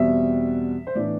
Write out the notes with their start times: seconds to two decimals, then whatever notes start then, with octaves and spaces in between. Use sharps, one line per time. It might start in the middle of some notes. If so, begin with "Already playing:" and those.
Already playing: E2 B2 G3 C4 E5
0.87 C5
0.95 A2 E3 B3 D4 D5